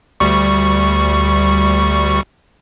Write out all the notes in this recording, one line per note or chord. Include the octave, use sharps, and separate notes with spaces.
D2 G3 C#6